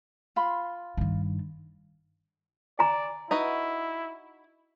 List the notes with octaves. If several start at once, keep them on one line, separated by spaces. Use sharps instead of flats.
F4 B5 C6
G2 D#3
D5 G#5 A#5
D#4 E4 F#4 B4